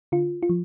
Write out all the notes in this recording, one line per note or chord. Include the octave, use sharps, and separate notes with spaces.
D3 F4
F4
F3